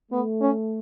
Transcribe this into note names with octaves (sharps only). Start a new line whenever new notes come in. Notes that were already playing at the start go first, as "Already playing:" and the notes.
A3 B3
C#4